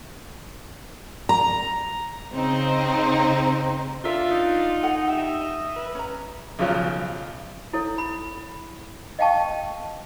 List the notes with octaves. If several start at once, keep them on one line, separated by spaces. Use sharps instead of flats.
A#5
C#3 C4 D#4 C5
D4 F4 A4 A#4 E5
D#4
A4 F#5 G#5
G4 D#5 E5
B4
C#4 A#5
B1 C#3 F3 F#3
E4 A4 C#5
B5
D#5 F5 G5 A5 C#6